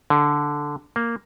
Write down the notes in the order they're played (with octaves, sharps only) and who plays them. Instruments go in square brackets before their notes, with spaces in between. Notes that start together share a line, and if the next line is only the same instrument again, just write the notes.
[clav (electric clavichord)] D3
A#3